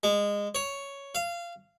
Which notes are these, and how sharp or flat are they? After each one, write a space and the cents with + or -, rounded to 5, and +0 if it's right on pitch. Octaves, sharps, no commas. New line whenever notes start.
G#3 -20
C#5 +5
F5 -20